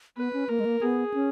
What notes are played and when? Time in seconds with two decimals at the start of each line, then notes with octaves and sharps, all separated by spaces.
0.17 B3 B4
0.33 C#4
0.49 A#3 A#4
0.60 G#3
0.65 A#3
0.81 B3 G#4
1.14 C#4